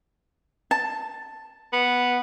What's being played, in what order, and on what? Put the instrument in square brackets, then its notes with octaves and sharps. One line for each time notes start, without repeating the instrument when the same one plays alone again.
[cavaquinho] A5
[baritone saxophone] B3